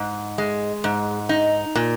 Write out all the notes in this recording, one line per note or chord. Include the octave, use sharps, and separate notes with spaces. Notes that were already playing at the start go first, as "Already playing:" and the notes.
Already playing: G#2
G#3
G#2
D#4
A#2